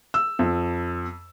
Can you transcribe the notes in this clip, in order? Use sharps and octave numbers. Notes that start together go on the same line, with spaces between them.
E6
F2